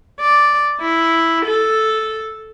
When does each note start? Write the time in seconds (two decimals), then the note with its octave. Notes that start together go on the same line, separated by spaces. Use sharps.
0.21 D5
0.81 E4
1.46 A4